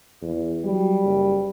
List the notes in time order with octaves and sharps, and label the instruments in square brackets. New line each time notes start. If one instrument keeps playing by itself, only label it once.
[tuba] E2
[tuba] F#3 [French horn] G3
[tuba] F#1